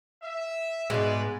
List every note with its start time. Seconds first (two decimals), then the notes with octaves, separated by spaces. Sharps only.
0.22 E5
0.90 G#2 B2 G#3 B4 D5